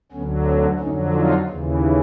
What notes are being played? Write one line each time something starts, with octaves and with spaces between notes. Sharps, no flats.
D2 D3 F#3 B3 C#4
C4 D4
F2 D3 F#3 C#4 D#4
D#4 F4
D#2 C#3 E3